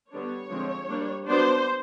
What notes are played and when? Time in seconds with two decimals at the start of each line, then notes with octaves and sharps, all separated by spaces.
0.11 D3 G3 B3 D4 C#5
0.50 D3 F3 G#3 C4
0.88 G3 A#3 D4
1.27 F#3 B3 D4 C5